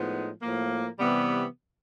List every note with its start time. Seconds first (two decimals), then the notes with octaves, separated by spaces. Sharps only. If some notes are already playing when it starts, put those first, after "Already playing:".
Already playing: A2 F3 G#3 B3 D#4
0.42 A2 F3 A#3
0.99 C3 E3 G3 B3